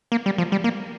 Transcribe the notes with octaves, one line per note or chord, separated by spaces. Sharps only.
A#3
G3
F3
G3
A#3